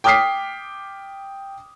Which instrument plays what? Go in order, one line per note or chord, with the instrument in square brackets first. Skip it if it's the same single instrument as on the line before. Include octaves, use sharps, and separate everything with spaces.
[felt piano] G5 D6 D#6 F6 B6 C7